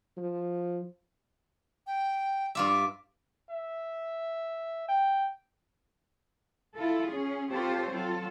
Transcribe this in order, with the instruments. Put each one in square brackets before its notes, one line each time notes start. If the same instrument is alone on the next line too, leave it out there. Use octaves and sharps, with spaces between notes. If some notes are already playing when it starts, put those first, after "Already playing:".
[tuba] F3
[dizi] G5
[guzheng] G2 F4 E5 [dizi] D6
[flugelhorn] E5
G5
[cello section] E4 F4 A4
C#4 G#4
C4 F4 G4 A4 C5 C#5
F#3 C4 F4 A4